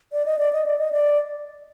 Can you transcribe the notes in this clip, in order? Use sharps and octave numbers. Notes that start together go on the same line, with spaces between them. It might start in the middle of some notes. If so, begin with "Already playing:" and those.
D5
D#5
D5
D#5
D5
D#5
D5